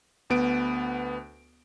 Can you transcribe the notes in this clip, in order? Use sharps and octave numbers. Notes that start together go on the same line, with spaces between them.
D2 B3 D7